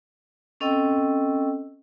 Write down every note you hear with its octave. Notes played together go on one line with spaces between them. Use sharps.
C4 C#4 A4 D#5 G5 E6